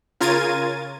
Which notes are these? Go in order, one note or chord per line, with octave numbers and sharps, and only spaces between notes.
C#3 F4 A#4 G#6 A6 D#7